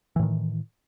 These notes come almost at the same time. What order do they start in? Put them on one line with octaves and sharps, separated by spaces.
E3 A2 D#3